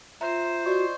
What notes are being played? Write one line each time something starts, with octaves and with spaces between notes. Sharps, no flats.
F4 C5 E5 A#5
F#4 D5 D#5 C#6